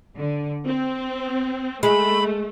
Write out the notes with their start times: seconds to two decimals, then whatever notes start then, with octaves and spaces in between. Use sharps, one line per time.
0.17 D3
0.67 C4
1.83 G#3 A3 B5